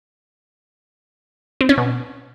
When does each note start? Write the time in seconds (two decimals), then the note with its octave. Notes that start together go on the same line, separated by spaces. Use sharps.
1.61 C4
1.69 C#4
1.78 B2